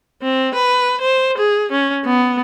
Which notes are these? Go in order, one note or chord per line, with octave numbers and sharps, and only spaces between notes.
C4
B4
C5
G#4
C#4
B3